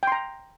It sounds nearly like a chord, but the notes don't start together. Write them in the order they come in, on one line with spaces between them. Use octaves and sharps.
G5 C6 A#5